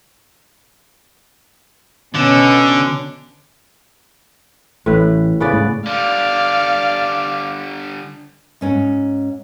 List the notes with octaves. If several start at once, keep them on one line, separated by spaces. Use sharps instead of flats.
B2 D3 C#4
A1 A2 B4
C#3 B3 D5
G#2 A3
D3 G3 D5 F5
G#2 C#4 D#4